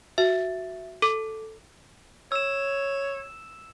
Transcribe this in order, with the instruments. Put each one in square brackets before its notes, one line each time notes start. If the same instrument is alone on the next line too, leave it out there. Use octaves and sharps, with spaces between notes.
[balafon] F#4 [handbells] E5
[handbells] A4 [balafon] D6
[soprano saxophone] C#5 [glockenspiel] E6 E7